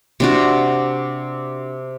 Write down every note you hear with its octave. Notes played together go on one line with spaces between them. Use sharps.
C3 D4 F#4